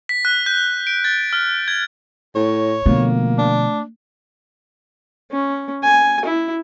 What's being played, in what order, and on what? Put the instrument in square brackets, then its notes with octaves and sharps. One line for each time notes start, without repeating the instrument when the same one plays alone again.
[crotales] B6
F#6
G6
D7
A6
F6
G#6
[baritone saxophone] A2 [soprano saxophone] C#5
[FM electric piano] B2 D3 F3 [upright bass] A3 [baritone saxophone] A#3
[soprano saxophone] D4
[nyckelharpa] C#4
G#5
E4